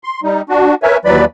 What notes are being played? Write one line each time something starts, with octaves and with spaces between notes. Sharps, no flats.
C6
G3 D#4
D4 F#4
A#4 B4 C#5 E5 G#5
D#2 E3 F#3 B4 D5 B5